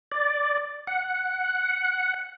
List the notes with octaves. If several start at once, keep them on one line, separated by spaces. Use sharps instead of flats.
D5
F#5